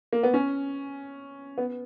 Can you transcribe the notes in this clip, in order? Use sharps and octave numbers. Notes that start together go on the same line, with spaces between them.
A#3
B3
C#4
B3